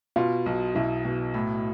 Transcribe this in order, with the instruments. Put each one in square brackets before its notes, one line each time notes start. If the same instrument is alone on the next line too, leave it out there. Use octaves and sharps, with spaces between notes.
[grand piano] B2 [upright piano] F4
[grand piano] B1
[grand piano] B1 [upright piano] E4
[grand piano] B2
A2